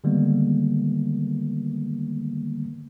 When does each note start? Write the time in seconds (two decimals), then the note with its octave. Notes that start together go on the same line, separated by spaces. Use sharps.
0.04 D3 D#3 G3 G#3 A#3 B3